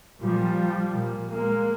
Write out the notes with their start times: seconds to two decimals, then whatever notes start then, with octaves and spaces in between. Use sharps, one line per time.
0.22 A#2 F3 G3
0.94 A#2
1.30 G#3 A#3